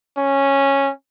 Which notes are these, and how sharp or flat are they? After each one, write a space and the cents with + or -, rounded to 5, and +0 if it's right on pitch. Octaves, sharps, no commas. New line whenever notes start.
C#4 -10